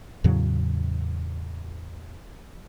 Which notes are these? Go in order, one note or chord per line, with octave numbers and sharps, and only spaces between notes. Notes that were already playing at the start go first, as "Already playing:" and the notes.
E2 A2 C#3 F#3